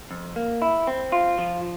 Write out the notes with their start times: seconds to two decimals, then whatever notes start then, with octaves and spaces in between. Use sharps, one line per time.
0.11 F2
0.36 A#3
0.62 E4
0.87 C4
1.12 F4
1.38 F3